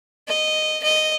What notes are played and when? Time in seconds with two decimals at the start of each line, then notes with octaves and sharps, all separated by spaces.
0.28 D#5
0.83 D#5